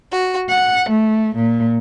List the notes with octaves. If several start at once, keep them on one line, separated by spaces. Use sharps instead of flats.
F#4
F#5
A3
A#2